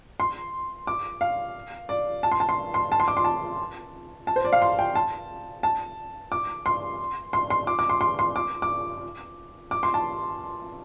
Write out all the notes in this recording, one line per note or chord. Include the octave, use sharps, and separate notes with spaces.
C6
D6
F5
D5
A5
C6
A5
C6
C6
A5
C6
D6
C6
A5
A5
C5
D5
F5
C6
G5
A5
A5
D6
C6
C6
C6
D6
D6
C6
C6
C6
D6
D6
D6
C6
A5